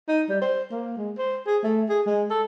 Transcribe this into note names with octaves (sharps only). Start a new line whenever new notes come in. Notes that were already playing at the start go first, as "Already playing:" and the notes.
D#4
G3
C5
A#3
G#3
C5
G#4
A3
G#4
G#3
A4